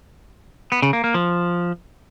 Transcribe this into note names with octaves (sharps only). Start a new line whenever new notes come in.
B3
C#3
A#3
A#3
F3